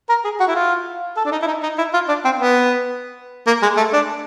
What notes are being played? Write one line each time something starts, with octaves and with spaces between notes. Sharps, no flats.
A#4
G#4
F#4
E4
F4
A4
D4
D#4
E4
D#4
D#4
E4
F4
D4
C4
B3
A#3
G#3
A3
D4